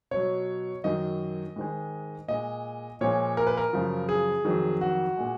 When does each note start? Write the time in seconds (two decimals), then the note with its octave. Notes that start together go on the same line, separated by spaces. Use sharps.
0.11 B2 F#3 C#5
0.84 F#2 D#3 F#3 D#5
1.56 G#2 D#3 G#3
2.28 A#2 G#3 D#5
3.01 A#2 F3 G#3 C#5
3.37 A#4
3.47 B4
3.57 A#4
3.73 F#2 C#3 F3
4.09 G#4
4.45 F2 D#3 F#3
4.81 F#4
5.17 A#2 G#3